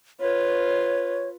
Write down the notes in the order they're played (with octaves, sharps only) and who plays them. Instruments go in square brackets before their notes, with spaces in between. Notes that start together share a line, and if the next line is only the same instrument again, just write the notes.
[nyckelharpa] F4 B4 [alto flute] C#5